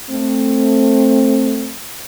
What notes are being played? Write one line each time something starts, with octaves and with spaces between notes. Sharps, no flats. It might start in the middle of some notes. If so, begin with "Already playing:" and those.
A3 C4